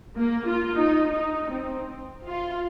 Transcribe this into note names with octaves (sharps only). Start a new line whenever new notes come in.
A#3
F4
D#4
D#4
C4
F4